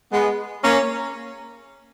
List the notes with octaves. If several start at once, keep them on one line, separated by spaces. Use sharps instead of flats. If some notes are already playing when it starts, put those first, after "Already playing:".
G#3 B3
A#3 C#4